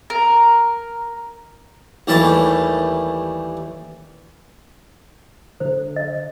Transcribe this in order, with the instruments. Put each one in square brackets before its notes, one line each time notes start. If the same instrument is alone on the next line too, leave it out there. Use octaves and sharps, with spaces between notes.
[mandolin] A#4
[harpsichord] D#2 E3 G3 A3 A5
[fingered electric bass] D3 [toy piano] C5
[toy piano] D#5